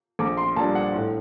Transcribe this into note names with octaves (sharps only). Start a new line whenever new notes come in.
A#1 D6
C6
A#2 G3 D4 A5
F#5
A2